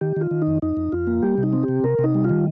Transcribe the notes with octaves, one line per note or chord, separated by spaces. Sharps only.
D#3 G4
D#3 F4
D#3
D#4
F2
F2 D#4
F2
F2 F4
A#3
G3 G4
C3
D#4
C4
G4
C3
C3 A#4
C3
D#4
G3
F4
D#3